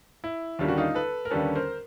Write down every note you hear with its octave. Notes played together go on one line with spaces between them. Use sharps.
E4
D#2 D3 G3 A#3 C#4 F4
F#4
D#4 F4
A4 B4
A#4
D#2 D3 G3 A#3 C#4 A4 B4
A#4 C5